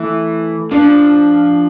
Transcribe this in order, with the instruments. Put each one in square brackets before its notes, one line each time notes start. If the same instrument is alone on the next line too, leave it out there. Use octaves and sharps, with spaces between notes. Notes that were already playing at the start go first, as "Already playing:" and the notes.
Already playing: [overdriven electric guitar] E3 [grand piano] A3
[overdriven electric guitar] F3 [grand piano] D4